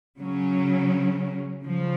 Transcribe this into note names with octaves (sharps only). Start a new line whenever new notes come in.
C#3 F#3 C#4
C#3 F3